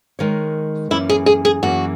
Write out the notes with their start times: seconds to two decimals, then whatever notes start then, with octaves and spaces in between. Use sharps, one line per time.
0.19 D#3 G#3 D#4 A#4 C#5
0.90 F#2 E3 A#3 C#4 E4
1.09 G#4
1.26 G#4
1.45 G#4
1.63 F#2 E3 A#3 C#4 F#4